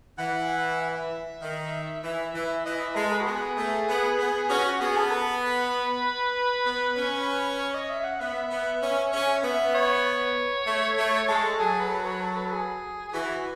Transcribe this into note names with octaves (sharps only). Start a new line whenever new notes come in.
E3 F#5
F#5
E5
D#3
E3
E3
E3 D#5
E5
G#3 A4
B4
F#4
B3 G#4
A3
B3
B3
C#4 F#4
F#4
B3 G#4
A4
B4
B3
C#4
C#5
D#5
E5
F#5
B3 E5
B3
C#4
C#4
B3 E5
C#5
A3
A3
G#3 A4
F#3 G#4
B4
A4
C#5
A4
B4
A4
G#4
G#4
E3 F#4